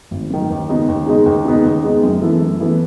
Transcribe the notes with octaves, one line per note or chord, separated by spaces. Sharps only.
G#1
F#2 D#3
D#2
C#3 G#3 B3 D#4
D#2
C#3 G#3 B3 D#4
D#2
C#3 G#3 B3 D#4
D#2
C#3 G#3 B3 D#4
F#2
E3 B3 E4 A4
F#2
E3 B3 E4 A4